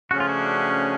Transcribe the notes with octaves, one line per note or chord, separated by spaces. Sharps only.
C#3 F3 A3 C#4 F#4
F4
D4 F#4